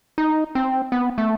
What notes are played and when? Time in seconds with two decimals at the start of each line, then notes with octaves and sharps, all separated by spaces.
0.18 D#4
0.55 C4
0.92 B3
1.18 A3